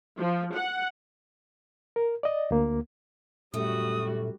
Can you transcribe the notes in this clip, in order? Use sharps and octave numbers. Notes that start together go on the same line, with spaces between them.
F3
F#5
A#4
D5 D#5
D2 A#3
F#2 A#2 G3 A3 F#4 D#6